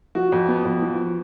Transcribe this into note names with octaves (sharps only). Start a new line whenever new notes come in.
F3 F#4
F2
B3
F2
F3